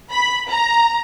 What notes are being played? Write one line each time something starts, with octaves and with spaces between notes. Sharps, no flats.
B5
A#5